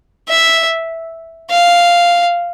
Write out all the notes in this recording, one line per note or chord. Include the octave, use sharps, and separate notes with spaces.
E5
F5